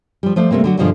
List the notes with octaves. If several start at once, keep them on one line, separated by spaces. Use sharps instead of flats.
F3 G3
F3 A3 C5 D5
C3 G3 A3 A#3 C4
D3 F#3 F#4
G2 B2 D3 F3 G3 G#3